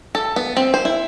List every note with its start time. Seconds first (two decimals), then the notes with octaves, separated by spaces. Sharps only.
0.15 A4
0.36 B3
0.57 C4
0.74 C5
0.85 E4